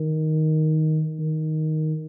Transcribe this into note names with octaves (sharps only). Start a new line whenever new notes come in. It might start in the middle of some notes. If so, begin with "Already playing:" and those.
Already playing: D#3
D#3